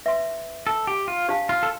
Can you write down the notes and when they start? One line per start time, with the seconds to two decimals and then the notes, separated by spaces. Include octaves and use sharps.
0.06 B4 E5 G5 C6
0.67 A4
0.87 G4
1.08 F4
1.28 D4 G4 C5 F5 A5
1.49 F4
1.63 A4